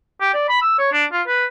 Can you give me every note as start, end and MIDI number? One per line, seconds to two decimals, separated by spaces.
0.21 0.30 67
0.34 0.47 74
0.49 0.60 83
0.61 0.76 88
0.79 0.90 73
0.93 1.05 62
1.12 1.22 65
1.28 1.45 71